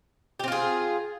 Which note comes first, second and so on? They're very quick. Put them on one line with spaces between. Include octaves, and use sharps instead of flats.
G4 C4 F4 G#4